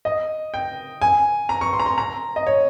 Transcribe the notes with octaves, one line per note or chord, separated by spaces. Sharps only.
D#5
G5
G#5
A#5
C#6
C6
A#5
C6
A#5
D#5
C#5